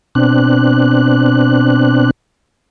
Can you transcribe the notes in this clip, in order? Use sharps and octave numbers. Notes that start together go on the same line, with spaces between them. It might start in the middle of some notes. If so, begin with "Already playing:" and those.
B2 C4 D4 F#6